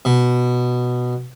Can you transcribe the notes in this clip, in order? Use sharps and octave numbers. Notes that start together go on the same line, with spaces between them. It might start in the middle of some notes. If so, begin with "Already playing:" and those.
B2